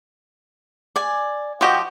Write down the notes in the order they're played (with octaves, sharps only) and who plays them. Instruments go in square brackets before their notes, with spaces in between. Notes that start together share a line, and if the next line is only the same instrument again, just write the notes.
[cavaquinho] D5 G#5
[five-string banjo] F3 G4 D#5 [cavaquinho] F#4 G5